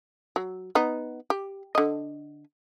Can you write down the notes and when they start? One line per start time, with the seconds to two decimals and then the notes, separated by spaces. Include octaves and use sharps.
0.36 F#3
0.75 B3 D#4
1.30 G4
1.75 D3 D#5